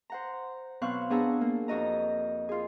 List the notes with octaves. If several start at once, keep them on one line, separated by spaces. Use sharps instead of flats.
C5 F#5 A#5
B2 F#3 C4 F5 C#6 F#6
B3 D4 G#4 F#5 A#5 E6
A#3
F2 F#4 D#5 A#5
F4 G#4